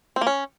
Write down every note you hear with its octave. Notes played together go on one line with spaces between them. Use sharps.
C4
A#3
C#4